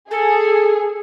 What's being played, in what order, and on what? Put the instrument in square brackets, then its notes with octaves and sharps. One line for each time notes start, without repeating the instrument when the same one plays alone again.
[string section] G#4 [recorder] A4